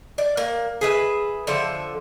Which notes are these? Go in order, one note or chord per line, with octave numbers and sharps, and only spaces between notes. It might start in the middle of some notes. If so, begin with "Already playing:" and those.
D5
A#3
G#4 B4 E5
D3 F3 E5